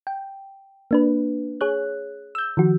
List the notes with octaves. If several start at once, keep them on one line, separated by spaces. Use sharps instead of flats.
G5
A#3 D4 B4
G#4 C#5 F#6
E6 G6
D#3 F3 F#4